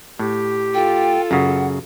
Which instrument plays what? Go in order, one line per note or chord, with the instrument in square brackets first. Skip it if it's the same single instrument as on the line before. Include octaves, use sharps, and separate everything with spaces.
[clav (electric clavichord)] A2 [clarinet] G4
[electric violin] F4 A4 [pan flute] G5
[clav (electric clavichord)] F#2 C#3 [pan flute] F#5